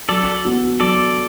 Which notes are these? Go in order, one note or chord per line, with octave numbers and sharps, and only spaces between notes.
F#3 A4 D5
B3 F#4
F#3 A4 D5